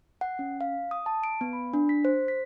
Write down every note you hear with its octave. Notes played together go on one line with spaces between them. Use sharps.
F#5
C#4
F5
D#6
A5
D7
B3
B5
D4
B6
C5
B6